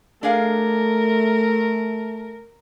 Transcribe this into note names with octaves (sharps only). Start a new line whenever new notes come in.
A3 D4 G#4 A#4 F5